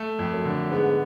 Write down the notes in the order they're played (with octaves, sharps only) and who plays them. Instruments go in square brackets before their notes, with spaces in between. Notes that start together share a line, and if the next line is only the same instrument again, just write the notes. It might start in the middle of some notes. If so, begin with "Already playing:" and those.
Already playing: [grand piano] A3
F2
[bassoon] F#2
[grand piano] D3
[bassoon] G#2 [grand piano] B3